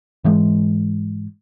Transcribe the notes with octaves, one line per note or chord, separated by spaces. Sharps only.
G#2 E3 G#3